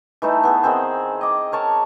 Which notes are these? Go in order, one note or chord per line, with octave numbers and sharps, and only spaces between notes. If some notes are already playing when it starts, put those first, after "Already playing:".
E3 A3 D#4
B3 G#4
D#3 C4 G#4 C5
D#5 D6
A#4 C#5 A5